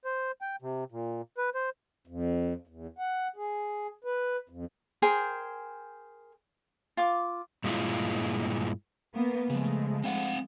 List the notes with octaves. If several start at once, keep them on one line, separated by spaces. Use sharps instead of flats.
C5
G5
C3
A#2
B4
C5
F2
E2
F#5
G#4
B4
F2
G#4 A#4 C5 G5
F4 D6
G2 A#2 G#3 A3 E4 F4
A#3 B3
C#3 F3 G#3 A3
C4 F5 F#5